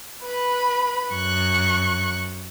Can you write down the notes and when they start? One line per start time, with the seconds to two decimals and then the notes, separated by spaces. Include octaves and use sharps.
0.25 B4 B5
1.13 F#2 C#6 F#6